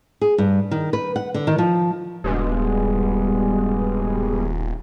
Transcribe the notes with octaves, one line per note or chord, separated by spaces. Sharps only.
G#4
G2
D#3
B4
F#5
D3
D#3
F3
D#1 G2 B2 G#3